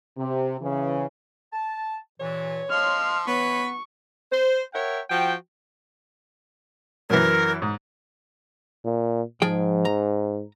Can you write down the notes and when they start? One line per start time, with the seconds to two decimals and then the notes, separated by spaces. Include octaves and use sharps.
0.17 C3
0.61 C#3 E3
1.53 A5
2.20 G2 A#2 E3 C#5
2.71 F3 D#5 F5 C6 F6
3.27 E3 B3 B4 C#5 C#6
4.31 C5
4.74 A#4 C#5 E5 F#5 G5
5.10 F3 F#4 G5
7.10 F#2 E3 A#4
7.62 G#2
8.84 A#2
9.42 G#2 F3 G#4 G5
9.85 A#5